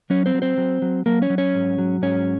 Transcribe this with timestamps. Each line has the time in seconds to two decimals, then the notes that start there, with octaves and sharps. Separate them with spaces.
0.10 F#3 C#4 C#5
0.26 C4 C5
0.34 F#3
0.42 C4 C5
0.58 F#3
0.82 F#3
1.06 F#3 A#3 A#4
1.22 C#4 C#5
1.30 F#3
1.38 C#4 C#5
1.55 G#2
1.78 F#3
2.02 G#2 C#4 C#5